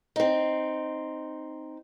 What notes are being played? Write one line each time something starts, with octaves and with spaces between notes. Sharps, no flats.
C4 D#4